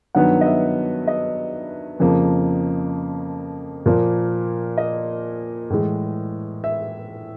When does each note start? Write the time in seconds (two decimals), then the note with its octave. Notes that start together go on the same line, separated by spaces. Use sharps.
0.15 G2 D#3 F#3 B3 F#5
0.41 D#5
0.46 E5
1.08 D#5
2.00 F2 C#3 F3 A#3
3.86 A#2 F3 A#3
4.78 D#5
5.70 A2 E3 G#3
6.64 E5